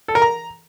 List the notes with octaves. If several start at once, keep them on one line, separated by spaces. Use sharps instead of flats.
A4
A#4
A#5